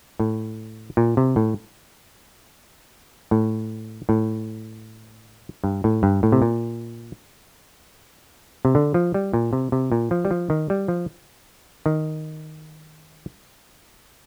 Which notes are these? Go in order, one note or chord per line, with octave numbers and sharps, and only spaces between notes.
A2
A#2
C3
A2
A2
A2
G2
A2
G2
A2
C3
A#2
C3
D3
F3
G3
A#2
C3
C3
A#2
F3
G3
F3
D#3
G3
F3
D#3